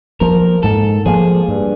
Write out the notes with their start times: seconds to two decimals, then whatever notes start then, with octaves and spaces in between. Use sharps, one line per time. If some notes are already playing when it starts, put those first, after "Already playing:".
0.20 F3 A#3 A#4
0.63 G#2 A4
1.06 F3 A#3 G#4
1.48 G2